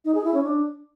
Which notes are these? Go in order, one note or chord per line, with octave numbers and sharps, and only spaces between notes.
D#4
G#4
E4
C#4
D4